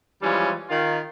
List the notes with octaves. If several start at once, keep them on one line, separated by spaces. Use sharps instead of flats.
E3 F3 G3 G#3 C#4
D#3 F4